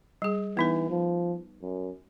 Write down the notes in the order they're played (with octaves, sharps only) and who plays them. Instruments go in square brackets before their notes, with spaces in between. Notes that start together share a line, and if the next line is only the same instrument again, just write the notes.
[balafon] G3 G#4
[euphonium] E3 [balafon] B3 D#4 B4
[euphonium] F3
F#2